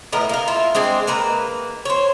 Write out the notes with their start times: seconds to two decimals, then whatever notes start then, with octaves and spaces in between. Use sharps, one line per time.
0.12 A2 B3 A#4 D#5
0.29 A#3 A#4
0.48 E4 F4
0.75 G#3 C4 D4 G#5
1.07 A#3 B4 A#5
1.85 C5 C#5